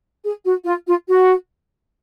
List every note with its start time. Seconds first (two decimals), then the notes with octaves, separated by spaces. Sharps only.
0.24 G#4
0.45 F#4
0.65 F4
0.86 F4
1.08 F#4